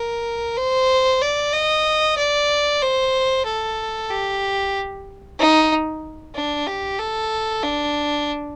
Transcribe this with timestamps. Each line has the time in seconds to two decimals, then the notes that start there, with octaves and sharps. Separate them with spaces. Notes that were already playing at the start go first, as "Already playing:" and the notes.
Already playing: A#4
0.57 C5
1.21 D5
1.53 D#5
2.17 D5
2.82 C5
3.46 A4
4.10 G4
5.39 D#4
6.35 D4
6.67 G4
7.00 A4
7.63 D4